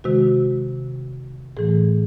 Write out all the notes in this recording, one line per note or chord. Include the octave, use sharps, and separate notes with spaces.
C3 D#3 G#3 F#4
A2 E3 A3 G#4